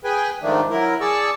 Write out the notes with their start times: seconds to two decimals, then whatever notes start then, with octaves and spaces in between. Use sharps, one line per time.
0.04 G#4 B4 G5 G#5
0.42 G#2 D#3 F3 A3 D4
0.70 F#3 E4 A#4
1.01 G#4 D5 A5 C#6 E6